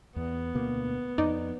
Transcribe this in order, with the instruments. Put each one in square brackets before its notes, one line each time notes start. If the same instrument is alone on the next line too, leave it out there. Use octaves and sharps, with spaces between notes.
[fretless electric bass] E2 [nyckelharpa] B3
[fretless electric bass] D2 B2 A#3
[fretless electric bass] F2 [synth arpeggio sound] D#4 D5